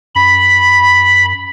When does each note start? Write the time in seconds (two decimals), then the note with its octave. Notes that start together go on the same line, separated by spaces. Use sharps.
0.15 F#2 B5